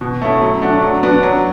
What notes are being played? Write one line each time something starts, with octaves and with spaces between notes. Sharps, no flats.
B2
A3 C#4 E4
F#3
A3 D4 F#4
F#3
B3 D4 F#4
F#3